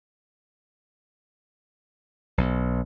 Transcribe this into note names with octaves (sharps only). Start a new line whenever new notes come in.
B1